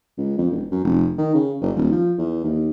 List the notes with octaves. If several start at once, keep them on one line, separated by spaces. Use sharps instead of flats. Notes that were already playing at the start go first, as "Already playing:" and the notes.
C#2
F2
E1
F#2
F1
D#3
C#3
F#1
D#1
F3
E2
D#2